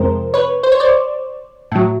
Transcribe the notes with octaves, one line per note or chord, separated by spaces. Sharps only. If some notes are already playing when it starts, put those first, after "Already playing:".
Already playing: F2 C3 F3 G#3 A#4 C5
B4 C#5
C5
C#5
C5 D5
A2 F#3